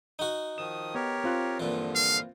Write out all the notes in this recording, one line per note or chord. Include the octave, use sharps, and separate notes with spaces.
D#4 F#4
D#3 F3 D#6 E7
B3 G4 A#4 C#5
C4 F4 F#6
G2 A#2 D3 E3 F3
F5